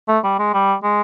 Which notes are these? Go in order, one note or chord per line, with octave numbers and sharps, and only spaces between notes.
A3
G3
G#3
G3
G#3